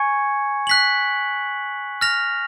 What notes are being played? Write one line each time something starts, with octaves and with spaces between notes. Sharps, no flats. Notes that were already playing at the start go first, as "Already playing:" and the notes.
Already playing: G#5 C#6 G#6 C#7
F#6 B6 F#7
F6 A#6 F7